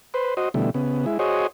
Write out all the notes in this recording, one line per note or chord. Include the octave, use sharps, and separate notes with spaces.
B4 C5
F#4 C5 D#5
B2 D3 E3 G3 A3
C#3 B3
G#3 E4
F#4 G#4 C5 C#5 D#5